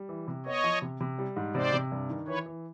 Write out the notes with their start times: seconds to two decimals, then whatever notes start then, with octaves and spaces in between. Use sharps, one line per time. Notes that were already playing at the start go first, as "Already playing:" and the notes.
Already playing: G3
0.09 E3
0.28 C3
0.46 B3 C#5 D#5
0.64 F3
0.82 C3
1.00 C3
1.18 G3
1.36 G#2
1.55 C3 C5 D5
1.73 C3
1.92 G2
2.09 D#3
2.27 E3 B4 C#5
2.46 E3